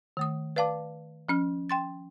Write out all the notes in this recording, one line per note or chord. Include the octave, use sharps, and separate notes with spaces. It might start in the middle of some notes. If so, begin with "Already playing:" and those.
D#3 A3 D#6
B4 D5 F5 A5 D6
F3 C#4 F6
G5 C6 A6